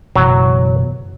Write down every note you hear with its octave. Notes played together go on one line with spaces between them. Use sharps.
F#1 B2 E3 F#3